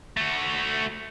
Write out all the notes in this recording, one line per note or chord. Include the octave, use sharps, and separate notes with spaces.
A3 F#4